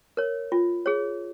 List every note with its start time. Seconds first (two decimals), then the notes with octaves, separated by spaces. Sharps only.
0.17 A#4 C#5
0.52 F4
0.86 G#4 C#5